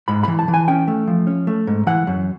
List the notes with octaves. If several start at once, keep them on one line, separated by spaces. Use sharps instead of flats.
G#2 B5
E3 B5
A5
E3
G#5
C#4 G5
A3
F3
C#4
A3
G#2
E3 F#5
F#2